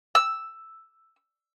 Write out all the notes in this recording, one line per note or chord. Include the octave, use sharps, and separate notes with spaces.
E6